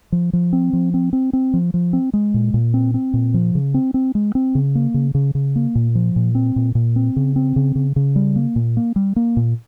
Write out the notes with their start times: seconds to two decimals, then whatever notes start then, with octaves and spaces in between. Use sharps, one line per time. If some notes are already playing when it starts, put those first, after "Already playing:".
0.12 F3
0.33 F3
0.53 C4
0.73 F3
0.94 C4
1.13 C4
1.33 C4
1.54 F3
1.74 F3
1.93 C4
2.13 G#3
2.34 A#2
2.54 A#2
2.74 C4
2.94 C4
3.14 A#2
3.34 F3
3.55 C#3
3.74 C4
3.94 C4
4.15 G#3
4.35 C4
4.55 C#3
4.75 A#3
4.94 C#3
5.15 C#3
5.35 C#3
5.56 A#3
5.75 A#2
5.95 F3
6.16 A#2
6.35 C4
6.56 A#2
6.75 A#2
6.96 C4
7.16 C#3
7.36 C4
7.56 C#3
7.75 C#3
7.96 C#3
8.16 G3
8.36 A#3
8.56 A#2
8.77 A#3
8.96 G3
9.16 A#3
9.37 A#2